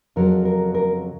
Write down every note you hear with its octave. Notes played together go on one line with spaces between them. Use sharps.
F2 C#3 F#3 A#4
A#4
A#4